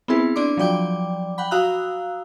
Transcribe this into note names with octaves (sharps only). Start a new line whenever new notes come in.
B3 C4 E4 G#4 B4
D4 D5 C6 D6
F3 F#3 D5 G5 D6
F#5 G5 B5
F#4 F5 A#5 D#6 E6 F#6